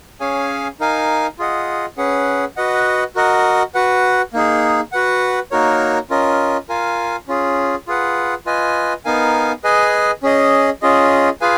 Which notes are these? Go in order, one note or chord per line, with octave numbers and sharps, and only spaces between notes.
C#4 G#4 C#5 F5 G#5
D#4 A#4 F5 G#5
F4 G#4 D#5 F#5
C#4 G#4 B4 F#5
F#4 B4 D#5 F#5
F#4 A#4 D#5 F#5
F#4 B4 F#5
A#3 D#4 G#4
F#4 B4 F#5
A#3 D#4 F#4 A#4 C#5
C#4 F4 A#4 D#5
F4 A#4 F5 G#5
C#4 F4 G#4
F4 G#4 B4 F#5
F4 B4 D#5 G#5
B3 D#4 A#4 F5 G#5
G#4 B4 D#5 G#5
C#4 G#4 D#5
C#4 F4 G#4 D#5
F4 G#4 B4 F5 G#5